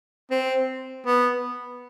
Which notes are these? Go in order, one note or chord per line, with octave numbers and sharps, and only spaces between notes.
C4
B3